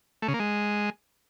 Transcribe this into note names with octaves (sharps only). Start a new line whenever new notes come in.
A3
C#3
A#3
G#3